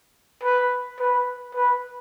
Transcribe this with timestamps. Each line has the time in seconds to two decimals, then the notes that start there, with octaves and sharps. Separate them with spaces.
0.43 B4
1.00 B4
1.55 B4